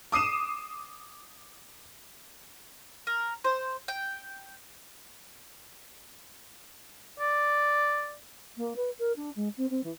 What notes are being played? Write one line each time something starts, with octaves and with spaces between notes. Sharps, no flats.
D6 D#6 C7 D#7 E7
A#4
C5
G5
D5
A#3
B4
A#4
D4
G#3
C4
C4
E3